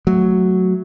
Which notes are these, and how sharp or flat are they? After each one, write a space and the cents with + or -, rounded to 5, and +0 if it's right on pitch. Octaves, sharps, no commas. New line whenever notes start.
F#3 +0 A3 +0